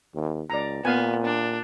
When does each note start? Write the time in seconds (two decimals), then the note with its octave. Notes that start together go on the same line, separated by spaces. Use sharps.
0.15 D#2
0.50 C#2 D5 A#5
0.85 A#2 B3 F5 G#5
1.25 D4